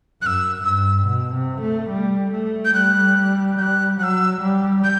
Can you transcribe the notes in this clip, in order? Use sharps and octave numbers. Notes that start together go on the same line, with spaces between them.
F#2 E6 F#6
G2 E6
B2
C3
A3
G3
A3
G6
G3 F#6
G3 F#6 G6
F#3 E6 F#6
G3
G6